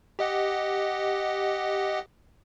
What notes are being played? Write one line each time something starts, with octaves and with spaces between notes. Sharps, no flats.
G4 D#5 F#5